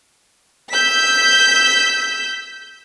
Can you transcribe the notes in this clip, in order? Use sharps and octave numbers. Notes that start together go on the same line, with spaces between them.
E6 G6 B6